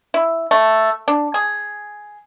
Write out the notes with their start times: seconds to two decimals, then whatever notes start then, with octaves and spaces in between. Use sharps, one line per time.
0.14 E4
0.51 A3
1.08 D4
1.34 G#4